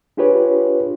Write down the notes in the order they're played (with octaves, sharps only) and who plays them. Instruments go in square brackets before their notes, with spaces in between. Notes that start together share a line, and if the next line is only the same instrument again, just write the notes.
[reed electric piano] D4 F4 G4 G#4 B4 C#5